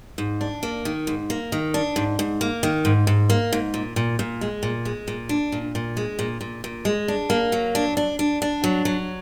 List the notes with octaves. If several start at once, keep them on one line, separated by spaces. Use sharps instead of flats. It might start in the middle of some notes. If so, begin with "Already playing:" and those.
G#2
D4
A#3
D#3
G#2
A#3
D#3
D4
G#2
G#2
A#3
D#3
G#2
G#2
A#3
G#2
A#2
A#2
A#2
G#3
A#2
G#3
A#2
D4
A#2
A#2
G#3
A#2
A#2
A#2
G#3
D4
A#3
F#3
D4
D4
D4
D4
F#3
F#3